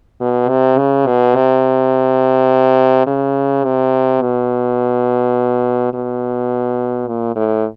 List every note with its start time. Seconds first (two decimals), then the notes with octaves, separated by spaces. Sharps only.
0.21 B2
0.49 C3
0.78 C#3
1.07 B2
1.35 C3
3.07 C#3
3.65 C3
4.21 B2
5.93 B2
7.08 A#2
7.36 A2